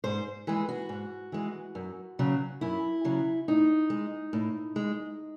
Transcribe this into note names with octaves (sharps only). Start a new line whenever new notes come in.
G#2 C5
E3 G#3 G#4
F#4
G#2
E3 G#3
F#2
C#3 F#3
F#2 E4
C#3 F#3
A2 D#4
G#3
A2
G#3